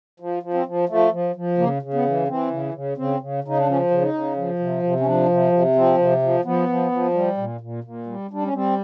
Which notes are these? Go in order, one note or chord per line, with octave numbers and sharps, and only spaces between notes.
F3
F3
C4
F3
F3 A3
F3
F3
C#3 A#3
C#3
B3
E3
E3 C4
C#3
C#3
C#3 C4
C#3
C#3 D#4
D4
F3 C#4
C#3
D#4
C#3
F3
C3
C3
C#4
F3 D4
C3
C3
F3 C4
C3
F3
F3 B3
F3
F3
G3
A#2
A#2
A#2
G3
G3 D4
C#4
G3 C4